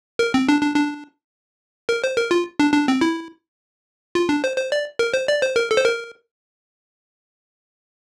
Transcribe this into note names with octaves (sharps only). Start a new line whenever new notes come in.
A#4
C4
D4
D4
D4
A#4
C5
A#4
F4
D4
D4
C4
E4
F4
D4
C5
C5
D5
A#4
C5
D5
C5
A#4
A4
C5
A#4